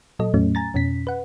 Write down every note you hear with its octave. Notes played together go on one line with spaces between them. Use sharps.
A#2 F#3 A4 D#5
E2 A2 F#3 A3 C#4
G#5 A#5 A6
F2 B2 C#4 B6
B4 F#5